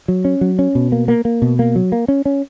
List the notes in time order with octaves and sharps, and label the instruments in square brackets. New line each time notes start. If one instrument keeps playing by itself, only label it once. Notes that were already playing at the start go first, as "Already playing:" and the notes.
[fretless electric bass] F#3
C#4
F#3
C#4
B2
A#3
A#3
A#3
B2
A#3
F#3
A#3
C#4
C#4